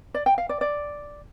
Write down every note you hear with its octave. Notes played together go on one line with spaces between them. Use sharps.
D5
G5
F5
D5
D5